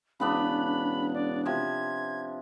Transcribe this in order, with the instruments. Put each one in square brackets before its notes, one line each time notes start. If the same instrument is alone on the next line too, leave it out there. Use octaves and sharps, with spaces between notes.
[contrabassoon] E1 [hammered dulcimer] C#3 B3 D4 [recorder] B5
[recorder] D5
[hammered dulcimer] C3 F3 [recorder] G#6